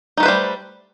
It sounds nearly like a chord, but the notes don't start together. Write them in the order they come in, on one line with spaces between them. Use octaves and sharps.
D#4 A3 B4 C5 G3